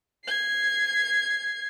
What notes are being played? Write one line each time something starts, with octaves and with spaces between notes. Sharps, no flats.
G#6 C7